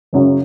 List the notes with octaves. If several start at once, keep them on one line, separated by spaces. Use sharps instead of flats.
F#1 F#2 C#3 F#3